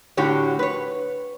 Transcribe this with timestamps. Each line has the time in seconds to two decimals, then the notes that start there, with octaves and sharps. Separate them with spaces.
0.17 A2 D3 F#4 G4 C#5
0.59 B4 C#5